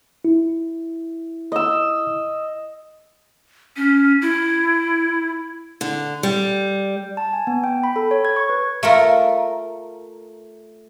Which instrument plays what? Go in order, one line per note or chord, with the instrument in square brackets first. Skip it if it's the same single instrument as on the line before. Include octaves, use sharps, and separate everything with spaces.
[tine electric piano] E4
[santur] D#5 E6
[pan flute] C#4
E4
[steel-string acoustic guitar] D3
G3
[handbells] A5
G#5
B3
G5
B5
A4
C#5
G#6
C#6
B4
[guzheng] A3 F4 A#4